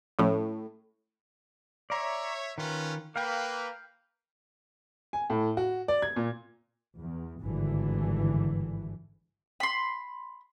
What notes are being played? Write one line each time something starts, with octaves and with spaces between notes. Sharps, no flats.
A2 F3 A3 C#4
C#5 D5 E5 A#5
D#3 C#4 F4 B4
A#3 B4 F5 G5
G#5
A2
F#4
D5
G#6
A#2
E2
G#1 G2 D3 E3
B5 C6